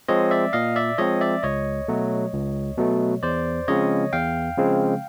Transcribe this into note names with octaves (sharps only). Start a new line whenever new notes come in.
F3 G#3 C4 C#5 D#5
D5 E5
A#2 D#5 F5
D5 E5
F3 G#3 C4 C#5 D#5
D5 E5
C#2 C#5 D#5
B2 F#3 A3
C#2
B2 F#3 A3
E2 C5 D5
C#3 F3 G#3 C4 C#5 D#5
E2 F5 G5
C#3 F3 G#3 C4